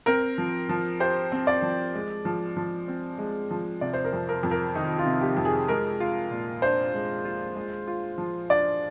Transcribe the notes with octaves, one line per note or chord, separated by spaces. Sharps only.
C4 A#4
F3
F3
G4 C5
C4
D5
F3
G#3
F3
F3
C4
G#3
F3
C3 D5
C5
A#4
F2
A#4
F2
A#4
D#3 D#4
F4
C3
G4
F2
G#4
G#3 A#4
F4
A#2
D4 C5
G#3
F4
G#3
F4
F3
D4 D5